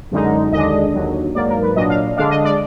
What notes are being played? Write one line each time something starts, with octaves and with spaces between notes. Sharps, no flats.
F#2 D3 G#3 D#4
D#2 D3 G#3 D4 D#5
D#2 D3 F#3
G#2 F#3 A#3 D5
A#4
B4
A#2 F#3 D4 D#5
F5
D3 G#3 D4 F5
D#5
D5